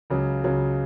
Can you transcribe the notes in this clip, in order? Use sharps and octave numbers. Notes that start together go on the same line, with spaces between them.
C#2 C#3 F#3
C#2 C#3 F#3